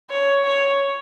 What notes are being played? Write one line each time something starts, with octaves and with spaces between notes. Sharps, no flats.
C#5
C#5